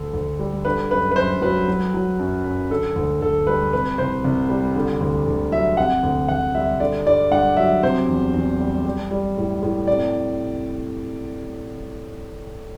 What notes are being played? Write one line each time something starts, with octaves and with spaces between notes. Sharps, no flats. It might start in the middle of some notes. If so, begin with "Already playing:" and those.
Already playing: D2 D3 A4
D2
G3
D3 B4
F#2 B4
B4
F#2 C5
F#3 B4
F#3
F#3
F#2
F#2
D3 A4
D2
D2 A4
G3 B4
C3 B4
C2 C5
C2
G3
D3
D2
D2
F#3 E5
C3 F#5
D2
D2 F#5
G3 E5
D3 D5
G2 D5
G2 F#5
F#3 E5
C3 C5
E2
E2
G3
G3
G3
A2
A2
C3 D5